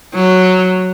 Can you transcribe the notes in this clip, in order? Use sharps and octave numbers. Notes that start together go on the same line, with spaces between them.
F#3